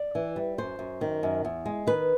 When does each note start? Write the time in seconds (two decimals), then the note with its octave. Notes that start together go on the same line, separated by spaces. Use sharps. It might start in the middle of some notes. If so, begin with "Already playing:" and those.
Already playing: D5
0.15 E3
0.36 G3
0.58 F#2 C5
0.79 F#2
1.01 D#3
1.23 F#2
1.45 E2
1.66 G#3
1.87 D#3 B4